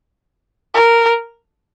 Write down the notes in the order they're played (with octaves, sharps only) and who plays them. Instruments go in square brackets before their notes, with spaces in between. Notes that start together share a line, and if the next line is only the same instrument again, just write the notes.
[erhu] A#4